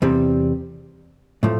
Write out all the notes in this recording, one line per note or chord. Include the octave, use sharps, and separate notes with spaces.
E2 C3 G3 C4
A2 F3 A3